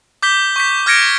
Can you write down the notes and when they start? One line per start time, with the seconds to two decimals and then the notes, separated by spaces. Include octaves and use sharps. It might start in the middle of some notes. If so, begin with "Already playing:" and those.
0.22 D6 G6 B6 G7
0.56 C#6 G6 B6
0.86 D6 F6 G#6 A#6 C#7 D7